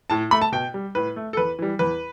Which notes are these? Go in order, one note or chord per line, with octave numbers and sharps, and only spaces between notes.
A2 A5
A3 B5
A5
B2 G5
G3
A2 B4
A3
A4
E2 B4
E3 G3
E2 B4